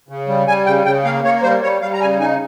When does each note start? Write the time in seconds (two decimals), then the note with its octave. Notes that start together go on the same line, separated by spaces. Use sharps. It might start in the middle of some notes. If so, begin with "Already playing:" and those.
0.09 C#3
0.27 G3
0.47 G3 G#5
0.66 C#3 G5
0.85 C#3 G5
1.05 A#3 F5
1.24 A#3 C#5
1.42 G3 C5
1.62 G3 C#5
1.81 G3 F5
1.93 A#5
2.00 C#3 G#5
2.20 D#4 G#5